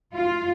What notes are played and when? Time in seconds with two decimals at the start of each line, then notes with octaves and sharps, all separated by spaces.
0.14 F4